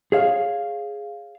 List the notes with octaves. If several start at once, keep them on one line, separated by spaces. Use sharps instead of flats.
G#4 C#5 F5